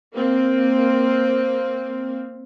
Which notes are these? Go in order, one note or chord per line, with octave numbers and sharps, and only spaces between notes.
A#3 C4